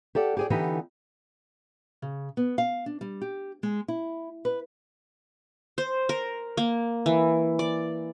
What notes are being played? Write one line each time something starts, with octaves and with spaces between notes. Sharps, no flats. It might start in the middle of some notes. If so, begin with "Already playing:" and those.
G4 A4 D5 F#5
G4 G#4 D5
D3 E3 B3 D#4 G4
C#3
B3
F5
D4
G3
G4
G#3
E4
B4
C5
A#4
A#3
E3
D5